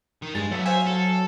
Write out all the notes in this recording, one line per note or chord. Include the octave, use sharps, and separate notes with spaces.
D#3
G2 G#3 A6
F#3 A3 B3
C5 E5 F5 G#5
A4